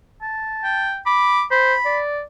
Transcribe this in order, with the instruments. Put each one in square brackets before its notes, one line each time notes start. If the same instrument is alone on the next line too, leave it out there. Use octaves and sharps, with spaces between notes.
[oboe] A5
[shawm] G5
[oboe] B5 [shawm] D6
[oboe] C5 [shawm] B5
[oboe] D5